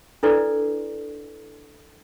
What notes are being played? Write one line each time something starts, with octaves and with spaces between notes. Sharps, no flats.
D4 E4 A4 B4 D5